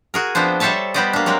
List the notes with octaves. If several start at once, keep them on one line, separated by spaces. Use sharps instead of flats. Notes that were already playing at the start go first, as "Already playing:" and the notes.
F#4 G#4 A#4
F3 B3 C4 D4 C5
G3 A4 C5 C#5 E5 A5
G3 B3 G4 C5 D5 D#5
A#3 D4
F#3 G#3 C4 A#4